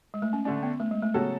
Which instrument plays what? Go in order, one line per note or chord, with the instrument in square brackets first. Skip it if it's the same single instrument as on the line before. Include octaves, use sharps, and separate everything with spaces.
[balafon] G#3
A3
C#4
[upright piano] D3 A3 D4 [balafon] C#4
[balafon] B3
A3
G#3
A3
[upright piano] C#3 F#3 C#4 F#4 A4 [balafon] B3